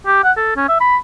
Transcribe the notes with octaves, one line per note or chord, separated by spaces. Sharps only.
G4
F#5
A4
C#4
E5
B5